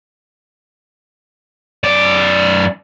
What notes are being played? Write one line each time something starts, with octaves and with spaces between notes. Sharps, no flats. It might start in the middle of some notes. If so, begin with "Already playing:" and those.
F#2 D5